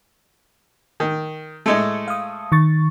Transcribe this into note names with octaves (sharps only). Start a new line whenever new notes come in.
D#3
A2 G#3 A3
F5 D#6
D#3 C#6 A6